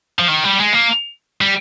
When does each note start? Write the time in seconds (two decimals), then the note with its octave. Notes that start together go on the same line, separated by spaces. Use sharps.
0.19 F3
0.28 D#3
0.44 G3
0.59 G#3
0.74 A#3
1.41 G3